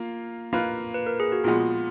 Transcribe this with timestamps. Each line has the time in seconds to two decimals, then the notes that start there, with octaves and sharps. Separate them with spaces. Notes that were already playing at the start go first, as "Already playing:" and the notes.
Already playing: A#3 F4
0.53 A#3 F4 B4
0.94 B4
1.07 A#4
1.20 G#4
1.32 F#4
1.44 A#2 F3 G#3 B3 F4